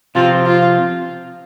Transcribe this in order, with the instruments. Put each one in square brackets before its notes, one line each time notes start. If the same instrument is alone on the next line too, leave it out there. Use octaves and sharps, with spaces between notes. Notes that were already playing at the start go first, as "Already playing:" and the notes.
[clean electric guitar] C3 F3 C4 [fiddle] F4
[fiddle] F4